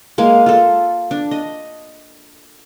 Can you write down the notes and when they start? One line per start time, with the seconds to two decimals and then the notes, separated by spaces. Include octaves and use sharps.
0.18 G#3 A#3 F5 G#5
0.46 F4 A4
1.11 D4
1.31 D#5